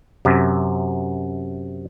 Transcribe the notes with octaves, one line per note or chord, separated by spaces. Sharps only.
F#2 C3